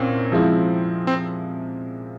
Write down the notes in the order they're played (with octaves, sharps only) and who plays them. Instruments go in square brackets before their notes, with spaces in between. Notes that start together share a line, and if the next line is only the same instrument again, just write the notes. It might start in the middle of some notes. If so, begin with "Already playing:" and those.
Already playing: [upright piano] C2 A#2 C#4 [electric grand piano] C4
[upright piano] C3 F3 G#3 E4
[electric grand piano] C4